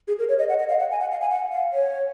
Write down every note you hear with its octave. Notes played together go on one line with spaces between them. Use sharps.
G#4
A#4
C#5
D#5
F#5
D#5
F5
F#5
G#5
F#5
F5
G#5
F#5
F5
C#5